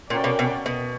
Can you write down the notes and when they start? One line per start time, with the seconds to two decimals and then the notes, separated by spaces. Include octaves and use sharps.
0.10 A#2 C#4 F#4 A#4 D5 G5
0.24 B2
0.39 B2
0.66 B2